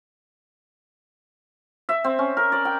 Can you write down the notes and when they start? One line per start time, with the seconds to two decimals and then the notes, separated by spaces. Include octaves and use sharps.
1.89 E5
2.04 C4
2.19 C#4
2.37 A#4
2.52 D5
2.65 G5